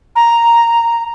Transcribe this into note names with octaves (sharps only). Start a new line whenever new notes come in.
A#5